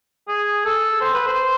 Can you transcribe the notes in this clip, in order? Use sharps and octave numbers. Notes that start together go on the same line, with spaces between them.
G#4
A4
C5
B4
C5